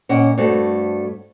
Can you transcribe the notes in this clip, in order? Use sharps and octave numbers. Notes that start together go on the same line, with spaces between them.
A#2 C#4 D#5 F#5 G5
G2 A3 C4 F#4